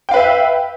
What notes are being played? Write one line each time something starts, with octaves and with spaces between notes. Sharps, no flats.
B4 E5 F5 G5